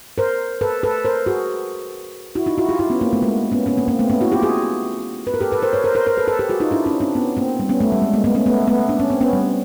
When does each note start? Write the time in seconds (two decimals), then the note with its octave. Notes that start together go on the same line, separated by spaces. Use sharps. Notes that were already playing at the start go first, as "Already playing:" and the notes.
0.18 A#4 C5
0.61 A4 B4
0.83 A4 B4
1.05 A#4 C5
1.26 F#4 G#4
2.35 E4 F#4
2.46 D#4 F4
2.58 E4 F#4
2.69 F4 G4
2.79 E4 F#4
2.90 B3 C#4
3.01 A#3 C4
3.13 A3 B3
3.23 G#3 A#3
3.52 B3 C#4
3.66 B3 C#4
3.77 A#3 C4
3.88 A#3 C4
3.99 A3 B3
4.10 B3 C#4
4.21 E4 F#4
4.32 F4 G4
4.43 F#4 G#4
5.27 B4
5.34 A#4
5.41 G4 A4
5.52 A4 B4
5.62 A#4 C5
5.73 B4 C#5
5.84 A#4 C5
5.95 A#4 C5
6.07 A#4 C5
6.17 A4 B4
6.28 A4 B4
6.39 G4 A4
6.50 F#4 G#4
6.60 D#4 F4
6.71 D4 E4
6.86 C#4 D#4
7.00 C4 D4
7.15 B3 C#4
7.37 A#3 C4
7.60 G3
7.69 B3 C#4
7.81 A3 B3
7.92 G3
8.02 G#3
8.13 G#3 A#3
8.24 A3 B3
8.35 B3 C#4
8.46 A3 B3
8.68 A3 B3
8.89 D4
9.00 C#4
9.10 C4
9.21 B3 C#4
9.33 G3